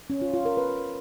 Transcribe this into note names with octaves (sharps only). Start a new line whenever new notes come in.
C#4
F4
F4
A#4
B4